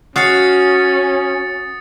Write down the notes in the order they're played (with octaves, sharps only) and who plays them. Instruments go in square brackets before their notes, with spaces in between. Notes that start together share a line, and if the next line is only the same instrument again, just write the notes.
[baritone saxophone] C#4 [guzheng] F#4 F5 [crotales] D#6 A6 C#7